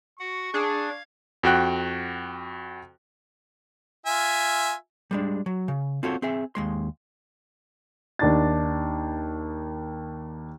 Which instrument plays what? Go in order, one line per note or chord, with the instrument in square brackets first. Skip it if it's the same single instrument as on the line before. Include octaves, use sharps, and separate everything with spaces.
[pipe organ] F#4 F#5 [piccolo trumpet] C#6
[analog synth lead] D4 [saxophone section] G#4 [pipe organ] F5 G#6
[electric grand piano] F2 F#4 G5 F#6
[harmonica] F4 E5 G#5
[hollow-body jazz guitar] G3 G#3 D4
F#3
C#3
C4 F4 F#4 A4 C5 C#5
C4 G#4 E5
D#2 G#3 C6
[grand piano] D#2 D4 A6